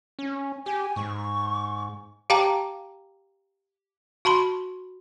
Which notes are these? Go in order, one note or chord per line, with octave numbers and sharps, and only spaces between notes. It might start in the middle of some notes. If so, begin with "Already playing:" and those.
C#4
G4 G#5
G#2 C#6
G4 F5 G5 A5 A#5 D6
F#4 A5 B5 C6